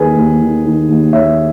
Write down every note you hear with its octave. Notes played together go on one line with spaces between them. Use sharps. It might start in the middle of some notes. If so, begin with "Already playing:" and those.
Already playing: D#2 D#3 G#4 B4
D#2
D#3
D#3
D#2
D#2 C#5 E5